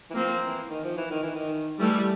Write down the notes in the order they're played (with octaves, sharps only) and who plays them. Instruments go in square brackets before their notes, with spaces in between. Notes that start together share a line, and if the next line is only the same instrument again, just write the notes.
[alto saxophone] E3
[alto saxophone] F3 [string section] A#3 C4
[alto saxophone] E3
D#3
F3
E3
D#3
E3
D#3
[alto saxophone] E3 [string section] G3 A3